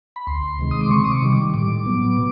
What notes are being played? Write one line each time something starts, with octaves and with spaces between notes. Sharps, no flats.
B5
D2 C6
C3 D#3 G#3
D#6
D6
C3 C#6
D#6
D6
D#3 G3
D6
A2 D6
F#3 B3
B2